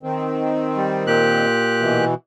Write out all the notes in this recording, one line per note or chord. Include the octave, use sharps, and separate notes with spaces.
D#3 C4
G3
A#2 G4 F#6
B2 E3